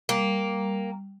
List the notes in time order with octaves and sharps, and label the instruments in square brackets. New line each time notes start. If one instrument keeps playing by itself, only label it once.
[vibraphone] G3 [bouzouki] A#3